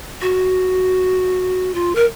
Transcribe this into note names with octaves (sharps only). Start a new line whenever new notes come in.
F#4
F4
A#4